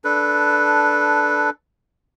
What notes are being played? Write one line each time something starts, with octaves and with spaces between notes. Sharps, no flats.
D4 A4 B4